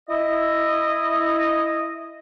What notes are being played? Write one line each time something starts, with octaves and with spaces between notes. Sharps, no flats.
E4 D#5